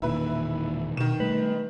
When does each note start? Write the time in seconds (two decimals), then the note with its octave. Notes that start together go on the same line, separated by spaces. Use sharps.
0.02 E1 A#2 D#3 E4 B4
0.97 B2 D#3 E7
1.20 G3 A3 B4